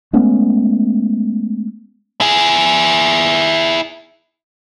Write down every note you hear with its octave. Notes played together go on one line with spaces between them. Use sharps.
G#3 A3 B3 C#4
E4 G#4